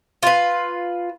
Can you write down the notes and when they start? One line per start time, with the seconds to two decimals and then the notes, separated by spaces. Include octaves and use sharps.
0.23 F4 B4